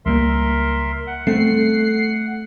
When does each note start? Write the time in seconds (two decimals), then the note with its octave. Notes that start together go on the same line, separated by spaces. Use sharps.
0.06 C#2 G3 A#3 A#4 E5 C6
1.07 F#5
1.27 G3 A3 B3 C4 C7